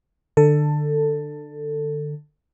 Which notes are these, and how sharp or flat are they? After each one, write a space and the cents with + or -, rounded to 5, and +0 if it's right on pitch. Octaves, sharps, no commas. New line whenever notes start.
D3 +25 A4 +15